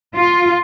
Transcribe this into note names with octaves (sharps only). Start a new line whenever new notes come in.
F4